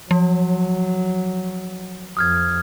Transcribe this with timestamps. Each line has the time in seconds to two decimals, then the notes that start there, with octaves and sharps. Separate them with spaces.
0.11 F3 F#3
2.17 F2 D#6 F6 G#6